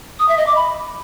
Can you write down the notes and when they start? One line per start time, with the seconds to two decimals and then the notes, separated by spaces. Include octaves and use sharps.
0.19 D#6
0.28 E5
0.38 D#5
0.47 D6
0.56 B5